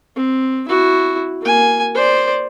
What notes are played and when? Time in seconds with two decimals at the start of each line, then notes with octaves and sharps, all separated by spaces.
0.16 C4
0.68 E4 F#4
1.41 A#3 G#5
1.95 C5 D5